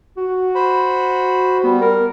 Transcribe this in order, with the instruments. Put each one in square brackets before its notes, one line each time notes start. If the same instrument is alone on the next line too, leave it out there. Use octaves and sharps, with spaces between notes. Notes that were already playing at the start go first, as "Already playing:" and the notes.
[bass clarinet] F#4
[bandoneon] C5 B5
[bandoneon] G3 [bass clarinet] B3
[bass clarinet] A#4